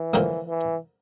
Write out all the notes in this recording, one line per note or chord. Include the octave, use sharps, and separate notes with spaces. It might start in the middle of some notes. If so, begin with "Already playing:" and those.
Already playing: E3
D3 F3 A#3
E3